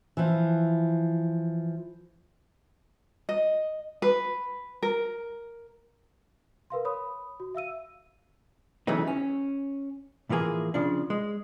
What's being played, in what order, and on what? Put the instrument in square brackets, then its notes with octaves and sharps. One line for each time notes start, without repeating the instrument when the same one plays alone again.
[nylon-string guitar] E3 F3
[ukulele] D#5
B4
A#4
[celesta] A#4 B4 F5 C6
C#5 B5 D#6
F#4
E5 F5 E6 D#7
[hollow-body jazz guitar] C#3 E3 F#3 A3 B3 D#4
C#4
A2 E3 F3 A#3 G#4
C#3 F3 D4
G#3